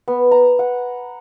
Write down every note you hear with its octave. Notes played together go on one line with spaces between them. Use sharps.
B3
A#5
F#5